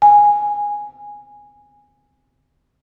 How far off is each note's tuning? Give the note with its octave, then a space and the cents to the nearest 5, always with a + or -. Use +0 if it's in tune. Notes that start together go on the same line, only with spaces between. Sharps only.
G#5 -10